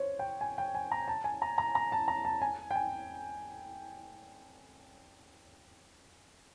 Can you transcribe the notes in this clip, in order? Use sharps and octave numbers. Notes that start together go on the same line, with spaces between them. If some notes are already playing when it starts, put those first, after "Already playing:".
Already playing: C5 C#5
G5
G#5
G5
G#5
A#5
A5
G#5
A#5
A#5
A#5
A5
A#5
A5
G#5
G5
G#5